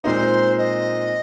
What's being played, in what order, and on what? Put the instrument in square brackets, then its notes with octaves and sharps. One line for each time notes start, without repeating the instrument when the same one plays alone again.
[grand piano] A#2 G#3 C4 D#4 [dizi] C5
[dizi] D#5